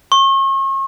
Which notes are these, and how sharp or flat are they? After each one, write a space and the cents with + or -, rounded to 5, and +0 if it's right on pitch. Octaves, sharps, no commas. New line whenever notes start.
C#6 -40